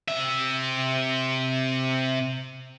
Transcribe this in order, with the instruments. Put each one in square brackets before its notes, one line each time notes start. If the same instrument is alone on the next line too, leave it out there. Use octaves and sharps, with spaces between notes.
[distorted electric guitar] C3 E5